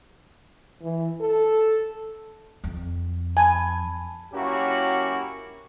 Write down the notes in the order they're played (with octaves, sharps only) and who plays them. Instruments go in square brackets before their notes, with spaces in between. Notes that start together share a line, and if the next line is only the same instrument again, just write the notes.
[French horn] E3
A4
[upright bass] F2
[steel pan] G#5 [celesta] A5 B5
[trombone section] F#3 A#3 C#4 E4 F#4 G4